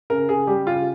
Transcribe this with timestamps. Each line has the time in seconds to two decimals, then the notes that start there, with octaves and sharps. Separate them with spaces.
0.10 C#3 A#4
0.28 C#3 G#4
0.47 G3 G4
0.67 C#3 F4